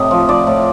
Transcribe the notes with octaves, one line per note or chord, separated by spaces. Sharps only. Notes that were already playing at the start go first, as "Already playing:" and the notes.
Already playing: A2 C3 G4 D#5
F3
F3 D5
A2